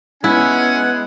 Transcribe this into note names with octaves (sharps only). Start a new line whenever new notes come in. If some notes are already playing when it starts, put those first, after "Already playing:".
G#3 B3 C#4 E4 F#5 G#5